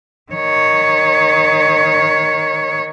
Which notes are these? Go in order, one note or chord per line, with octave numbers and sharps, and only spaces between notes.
D#3 C#5